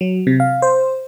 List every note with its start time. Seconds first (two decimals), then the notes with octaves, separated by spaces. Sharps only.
0.01 F#3
0.27 C3
0.40 F5
0.62 C5